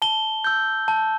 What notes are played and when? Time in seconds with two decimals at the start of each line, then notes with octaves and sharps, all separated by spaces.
0.02 A5 G7
0.44 E6 G6
0.88 A5